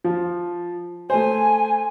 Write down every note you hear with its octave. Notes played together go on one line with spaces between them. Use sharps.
F3
A3 C5 G#5